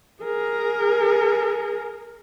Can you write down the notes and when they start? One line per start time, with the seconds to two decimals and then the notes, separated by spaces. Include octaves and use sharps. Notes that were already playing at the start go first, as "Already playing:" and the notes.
0.23 G#4 A#4